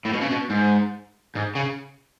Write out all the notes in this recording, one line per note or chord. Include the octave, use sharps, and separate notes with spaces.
A2
B2
C#3
B2
G#2
G#2
C#3